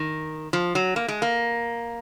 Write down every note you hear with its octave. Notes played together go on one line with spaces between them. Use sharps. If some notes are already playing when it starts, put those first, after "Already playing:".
Already playing: D#3
F3
F#3
A#3
G#3
A#3